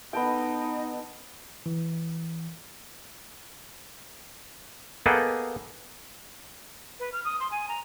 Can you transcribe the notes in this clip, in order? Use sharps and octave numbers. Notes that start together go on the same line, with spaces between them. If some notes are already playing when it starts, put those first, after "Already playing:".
B3 D#4 A4 D#5 G5
E3
A#3 B3 G#4 A4 D#5 G5
B4
F6
D#6
C6
G#5
A#5